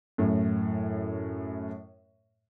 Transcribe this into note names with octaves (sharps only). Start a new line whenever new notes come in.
F#2 A2